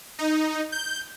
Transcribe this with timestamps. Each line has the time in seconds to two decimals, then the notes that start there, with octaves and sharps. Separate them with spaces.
0.19 D#4
0.72 G6